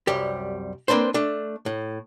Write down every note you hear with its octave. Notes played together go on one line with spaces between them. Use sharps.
C2 F#2 G3 G4
A#3 C4 D4 B4 C5
A3 D4
A2